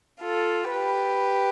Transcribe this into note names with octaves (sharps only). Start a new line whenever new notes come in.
F4 A4
G4 B4